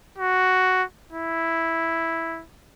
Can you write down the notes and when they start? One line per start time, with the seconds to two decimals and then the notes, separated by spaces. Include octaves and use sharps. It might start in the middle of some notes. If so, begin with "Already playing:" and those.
0.18 F#4
1.12 E4